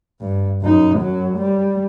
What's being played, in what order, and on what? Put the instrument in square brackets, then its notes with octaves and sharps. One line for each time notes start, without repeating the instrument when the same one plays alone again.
[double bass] G2
F#2 D#4
F#2 F#3
G3